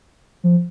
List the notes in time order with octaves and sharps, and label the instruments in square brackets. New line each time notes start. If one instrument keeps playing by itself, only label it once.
[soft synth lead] F3